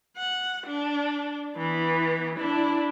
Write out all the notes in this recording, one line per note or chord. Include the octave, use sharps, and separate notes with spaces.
F#5
D4
E3 B3
D4 E4